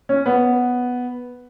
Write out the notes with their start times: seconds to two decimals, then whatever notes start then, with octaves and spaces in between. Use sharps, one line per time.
0.09 C#4
0.26 B3